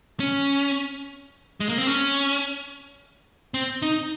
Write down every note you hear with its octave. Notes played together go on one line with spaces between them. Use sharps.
C#4
G#3
A#3
C4
C#4
C4
D#4